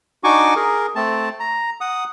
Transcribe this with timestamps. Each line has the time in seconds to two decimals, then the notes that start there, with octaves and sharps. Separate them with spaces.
0.24 D4 D#4 F#4 G#5 C#6 D6
0.56 G#4 A#4
0.96 A3 C4 A5
1.40 A#5
1.81 F#5 D#6